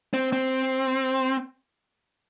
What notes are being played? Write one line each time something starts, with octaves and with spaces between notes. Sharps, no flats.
C4
C4